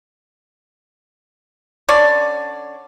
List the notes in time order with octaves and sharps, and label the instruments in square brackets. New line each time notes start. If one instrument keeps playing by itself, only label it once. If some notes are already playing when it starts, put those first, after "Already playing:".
[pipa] D3 C#4 C#5 D5